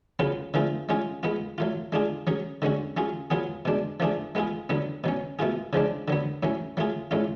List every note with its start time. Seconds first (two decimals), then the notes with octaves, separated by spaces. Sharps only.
0.19 C#3 F#3 B3 F4
0.54 D3 F3 A3 F4 G#4
0.89 G#3 C#4 F4 G#4
1.23 G#3 B3 F4
1.58 F#3 A3 F4
1.92 G#3 D4 F4 G#4
2.27 F#3 C#4 G#4
2.62 D3 G#3 C#4 F#4
2.97 F#3 C#4 F4 G#4
3.30 F#3 B3 F4 G#4
3.65 B2 G#3 D4
4.00 F3 A3 D4 F4 G#4
4.35 G#3 B3 F4 G#4
4.69 D3 F#3 B3
5.04 B2 F#3 C#4
5.39 B2 A3 F4 G#4
5.73 C#3 F3 G#3 D4
6.08 D3 F#3 B3
6.43 A2 F#3 C#4
6.77 F#3 A3 F4 G#4
7.11 A2 G#3 C#4 F4